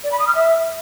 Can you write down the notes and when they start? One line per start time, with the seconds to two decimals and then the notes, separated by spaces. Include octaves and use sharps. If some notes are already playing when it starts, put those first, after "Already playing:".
0.04 D5
0.12 B5
0.19 D#6
0.27 F6
0.35 E5